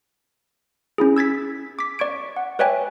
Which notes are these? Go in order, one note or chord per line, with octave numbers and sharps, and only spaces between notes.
C#4 E4 G#4
E6 G#6 A6 B6
D6 B6
D5 C#6 G#6 D7
F#5
B4 C#5 D5 E5 G5 G#5